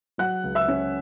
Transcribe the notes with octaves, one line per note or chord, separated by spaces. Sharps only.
F#3 F#5 F#6
C#2
E5 E6
C#4